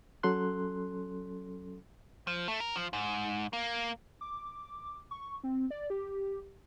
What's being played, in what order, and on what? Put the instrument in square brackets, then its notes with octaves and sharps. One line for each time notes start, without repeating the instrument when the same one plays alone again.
[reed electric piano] F#3 C#4 A4 C6 F#6
[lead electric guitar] F3
A3
A#4
F3
G#2
A#3
[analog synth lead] D6
C#6
C4
D5
G4